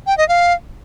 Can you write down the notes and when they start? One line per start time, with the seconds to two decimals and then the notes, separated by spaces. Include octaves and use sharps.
0.07 G5
0.18 D#5
0.29 F5